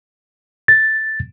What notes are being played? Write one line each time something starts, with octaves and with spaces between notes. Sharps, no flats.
A6